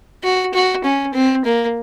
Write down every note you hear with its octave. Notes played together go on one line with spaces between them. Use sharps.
F#4
F#4
C#4
C4
A#3